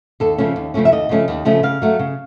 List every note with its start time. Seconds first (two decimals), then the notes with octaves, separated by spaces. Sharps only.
0.20 D#2 A4
0.38 C#3 F3 A3 C#4
0.56 D#2
0.74 C#3 F3 A3 C#4
0.85 E5
0.92 D#2 D#5
1.09 C#3 F3 A3 C#4
1.28 D#2
1.45 C#3 F3 A3 C#4
1.63 C#3 F5
1.82 F#3 A3
1.99 C#3